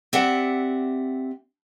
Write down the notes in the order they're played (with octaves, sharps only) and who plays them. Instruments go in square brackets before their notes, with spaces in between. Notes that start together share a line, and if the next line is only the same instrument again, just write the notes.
[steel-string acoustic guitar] C4 G4 D5 E5 F#5